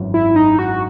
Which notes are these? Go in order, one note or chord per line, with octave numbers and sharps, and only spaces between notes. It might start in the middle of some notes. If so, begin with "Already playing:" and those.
Already playing: G#1 F#2 E3
E4
D#4
F#4